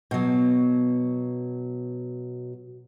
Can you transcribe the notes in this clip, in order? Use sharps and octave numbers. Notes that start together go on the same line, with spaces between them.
B2 F#3